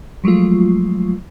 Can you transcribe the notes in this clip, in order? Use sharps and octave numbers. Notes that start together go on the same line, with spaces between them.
F3 F#3 G#3 A3 F4